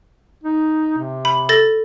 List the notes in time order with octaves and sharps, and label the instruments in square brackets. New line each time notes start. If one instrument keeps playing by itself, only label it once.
[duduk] D#4
C3
[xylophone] B5
A4 A6 A#6